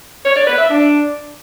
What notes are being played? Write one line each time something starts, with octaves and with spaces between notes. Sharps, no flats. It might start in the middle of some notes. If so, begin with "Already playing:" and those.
C#5
D5
B4
E5
D4